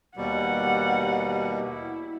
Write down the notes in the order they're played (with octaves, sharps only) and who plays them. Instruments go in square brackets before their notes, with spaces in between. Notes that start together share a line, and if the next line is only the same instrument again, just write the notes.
[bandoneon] D#2 B2 G3 [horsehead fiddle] F#5
[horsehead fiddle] E4